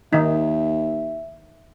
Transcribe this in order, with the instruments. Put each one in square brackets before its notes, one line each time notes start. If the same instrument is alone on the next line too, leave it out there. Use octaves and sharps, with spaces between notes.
[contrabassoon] D#2 [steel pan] D#3 D#4 [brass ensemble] E5